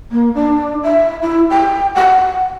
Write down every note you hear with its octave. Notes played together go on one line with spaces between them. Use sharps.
A#3
D4
E5
E4
G5
F#5